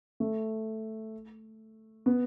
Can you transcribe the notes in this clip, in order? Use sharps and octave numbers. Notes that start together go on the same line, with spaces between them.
A3
B3